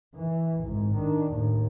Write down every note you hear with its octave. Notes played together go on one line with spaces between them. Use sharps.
E3
G#1 G#2
D#3 D4
D#2 A2